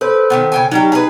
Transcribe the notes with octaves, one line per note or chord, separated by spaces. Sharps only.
A4 B4 C5
D#3 G3 B3
C#3 G5 G#5
F#3 G3 D#4 G4
G#4 A#4 B4